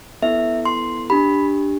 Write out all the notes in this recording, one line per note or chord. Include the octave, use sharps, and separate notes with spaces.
B3 E4 A4 E5
C6
D4 G4 B5